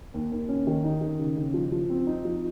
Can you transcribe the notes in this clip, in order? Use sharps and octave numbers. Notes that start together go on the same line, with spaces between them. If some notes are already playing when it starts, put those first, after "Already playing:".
D#2
D#2
C#4
D#3
D#4
D#3
C#3
C#3
F3
F3
C4
D#4
F3